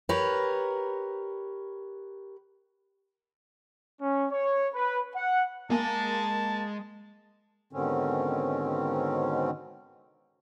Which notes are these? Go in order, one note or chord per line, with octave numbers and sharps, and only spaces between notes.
G4 A#4 B4 C#5
C#4
C#5
B4
F#5
G#3 A#3 G#5 A5
G#2 B2 D3 D#3 C4 C#4